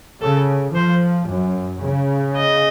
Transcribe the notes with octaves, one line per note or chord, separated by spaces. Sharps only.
C#3 A4
F3 C5
F#2
C#3
D#5